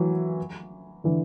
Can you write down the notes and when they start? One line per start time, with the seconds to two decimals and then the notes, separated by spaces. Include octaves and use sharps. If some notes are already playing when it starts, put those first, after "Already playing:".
Already playing: E3 F#3
1.04 D3 E3